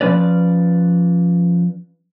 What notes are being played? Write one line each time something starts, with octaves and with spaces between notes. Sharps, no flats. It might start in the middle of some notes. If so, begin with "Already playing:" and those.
F3 C#4 B4 D5